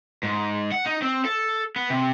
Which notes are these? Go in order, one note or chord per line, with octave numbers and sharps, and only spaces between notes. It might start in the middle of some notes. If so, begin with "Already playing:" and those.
G#2
F#5
D#4
C4
A4
B3
C3